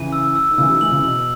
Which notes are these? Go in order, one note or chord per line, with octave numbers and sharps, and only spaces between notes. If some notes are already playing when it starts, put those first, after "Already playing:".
Already playing: C#3 E3 D#7
E6
E6
D#3
C#3 E3 E6
D#3 F#3
E3 G#3 F#7
C#3 E3
B2 F#7